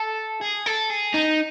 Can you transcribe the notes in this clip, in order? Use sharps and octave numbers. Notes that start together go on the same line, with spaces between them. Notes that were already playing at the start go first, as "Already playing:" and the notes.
Already playing: A4
G#4
A4
G#4
D#4